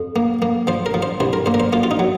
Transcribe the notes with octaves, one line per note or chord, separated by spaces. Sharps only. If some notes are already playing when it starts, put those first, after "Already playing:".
Already playing: F2
A#3
A#3
F3 C5
A#4
F3
C5
C2 C5
A#4
A#3 C5
A#4
C5
A#3 F4
F4
D#4
F#3